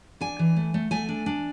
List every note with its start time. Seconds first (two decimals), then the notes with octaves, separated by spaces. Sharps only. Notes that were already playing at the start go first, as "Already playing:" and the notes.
0.21 D4 G#5
0.39 E3
0.56 A3
0.74 A3
0.91 A3 G#5
1.09 D4
1.26 D4